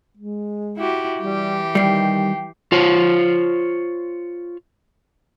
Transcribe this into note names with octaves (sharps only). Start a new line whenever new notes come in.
G#3
E4 F#4 G4
E3 G3 G4
D#3 G3 G5 C7
F4 C5 C#5